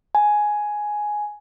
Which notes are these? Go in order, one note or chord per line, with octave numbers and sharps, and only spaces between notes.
G#5